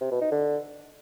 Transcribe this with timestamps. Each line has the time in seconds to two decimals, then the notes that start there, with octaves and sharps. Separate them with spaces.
0.01 C3
0.11 B2
0.21 D#4
0.31 D3